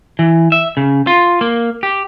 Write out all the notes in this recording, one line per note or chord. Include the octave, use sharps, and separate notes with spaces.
E3
E5
C#3
F4
A#3
G4